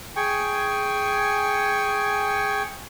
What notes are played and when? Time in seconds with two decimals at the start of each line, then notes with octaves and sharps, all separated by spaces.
0.16 G#4 G5 G#5 C#6